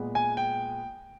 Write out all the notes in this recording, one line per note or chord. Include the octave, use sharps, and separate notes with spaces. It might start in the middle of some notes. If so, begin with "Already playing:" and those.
Already playing: A#2 G#3 B3
G#5
G5